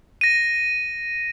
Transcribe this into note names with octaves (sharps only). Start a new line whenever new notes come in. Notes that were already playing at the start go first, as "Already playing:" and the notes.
A#6 D#7